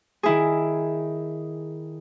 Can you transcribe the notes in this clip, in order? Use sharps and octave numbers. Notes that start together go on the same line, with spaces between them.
D#3 E4 G#4